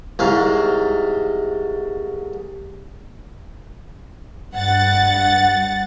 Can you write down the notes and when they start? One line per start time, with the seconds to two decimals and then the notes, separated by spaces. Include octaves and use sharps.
0.19 C2 G#2 F5
4.54 G2 F#5 A6